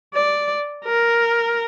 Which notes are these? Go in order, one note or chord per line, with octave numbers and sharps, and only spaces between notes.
D5
A#4